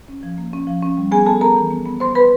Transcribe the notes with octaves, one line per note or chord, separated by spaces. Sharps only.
C#4
F3
A#3
C#4
F3
C#4
G3
B3 G#4 G#5
B3 A4 A5
B3 A#4 A#5
E3
B3
B3
B3 C5 C6
B3 B4 B5